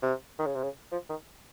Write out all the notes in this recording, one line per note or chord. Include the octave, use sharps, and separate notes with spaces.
C3
D#3
C#3
C3
C#3
F3
D#3